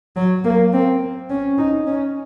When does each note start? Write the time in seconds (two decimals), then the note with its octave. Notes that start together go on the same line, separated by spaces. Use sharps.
0.16 F#3
0.44 A#3
0.73 C4
1.30 C#4
1.58 D#4
1.87 C#4